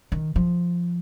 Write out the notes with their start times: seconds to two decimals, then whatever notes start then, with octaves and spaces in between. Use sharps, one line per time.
0.12 D#3
0.36 F3